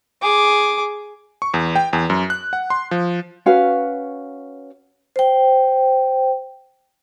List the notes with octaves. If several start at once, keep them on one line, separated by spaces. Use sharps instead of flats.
G#4 D6
C#6
E2
G5
E2
F#2
F#6
F#5
C6
F3
C#4 F#4 B4 F5
C5 G5